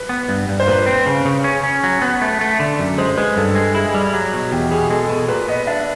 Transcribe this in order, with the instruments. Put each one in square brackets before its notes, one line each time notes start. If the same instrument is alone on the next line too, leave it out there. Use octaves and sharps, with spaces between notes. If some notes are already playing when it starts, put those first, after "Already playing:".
Already playing: [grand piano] B4
[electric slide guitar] B3
G2
G2
[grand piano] C5
[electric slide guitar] A#2 [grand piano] B4
[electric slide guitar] C4
C#3
C#3
C#4
C#4
F#3
B3
A3
A3
D3
F#2
[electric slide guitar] G#3 [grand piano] C5
[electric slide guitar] G#3 [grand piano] B4
[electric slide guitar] G2 [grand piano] A4
[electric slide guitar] G#3
[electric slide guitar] E4 [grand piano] G#4
[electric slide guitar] G3
F#3
B2
[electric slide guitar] E2 [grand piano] G4
[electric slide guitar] B2 [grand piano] G#4
[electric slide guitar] G#3 [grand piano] A4
[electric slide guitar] B2
[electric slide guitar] A#2 [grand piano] B4
[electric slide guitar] B3 [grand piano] D#5
[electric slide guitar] D4 [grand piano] E5